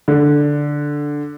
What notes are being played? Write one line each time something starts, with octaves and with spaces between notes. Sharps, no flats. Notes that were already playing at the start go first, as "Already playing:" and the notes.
D3